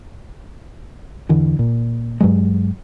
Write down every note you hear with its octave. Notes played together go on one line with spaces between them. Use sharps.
E2 D3 E3
A#2
G2 F#3 G#3